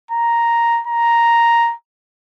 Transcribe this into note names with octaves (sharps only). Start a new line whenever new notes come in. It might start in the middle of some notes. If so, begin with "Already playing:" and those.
A#5
A#5